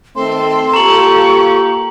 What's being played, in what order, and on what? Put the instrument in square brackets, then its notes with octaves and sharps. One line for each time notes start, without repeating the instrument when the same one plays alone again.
[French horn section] D#3 A3 C4 [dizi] A4 [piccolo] C6
[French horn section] A#3 F4 G4 [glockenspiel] A#5 F#7 [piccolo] C#6